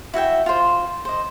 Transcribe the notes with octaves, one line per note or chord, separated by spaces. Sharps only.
E4 F#4 E5 G5
F4 C5
C5 D#5